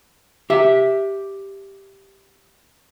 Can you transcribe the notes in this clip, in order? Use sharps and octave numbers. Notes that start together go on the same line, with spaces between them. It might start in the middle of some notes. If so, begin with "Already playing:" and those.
G4 E5